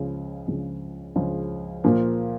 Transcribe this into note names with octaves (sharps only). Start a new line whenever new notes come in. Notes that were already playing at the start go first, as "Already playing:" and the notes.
Already playing: C#2 C#3 F3
C#2 C#3 F3
C#2 C#3 F3
A#2 F3 A#3